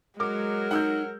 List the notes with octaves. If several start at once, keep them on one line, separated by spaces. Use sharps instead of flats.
F#3 G#3 A#4 D6
D#4 F#5 E6 G6